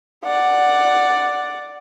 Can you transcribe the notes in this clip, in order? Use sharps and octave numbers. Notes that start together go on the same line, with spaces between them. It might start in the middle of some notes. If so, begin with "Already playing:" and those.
D5 F#5